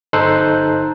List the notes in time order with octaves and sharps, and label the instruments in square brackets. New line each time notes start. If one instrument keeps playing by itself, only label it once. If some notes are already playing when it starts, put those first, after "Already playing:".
[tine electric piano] G1 D#4 A4 C5 F#6 C7